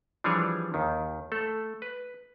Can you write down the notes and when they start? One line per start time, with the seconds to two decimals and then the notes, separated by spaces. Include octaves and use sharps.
0.24 E3 F3 G3 D4 G#4 C#5
0.74 D#2 D#3
1.32 A3 A4
1.82 B4